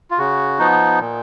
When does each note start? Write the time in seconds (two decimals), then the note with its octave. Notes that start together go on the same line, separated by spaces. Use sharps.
0.11 F4
0.18 C#3 F#4
0.59 F3 B3 D#4
1.00 A#2